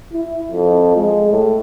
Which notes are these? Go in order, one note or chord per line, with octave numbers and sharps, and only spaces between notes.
E4
F2
G#3
A2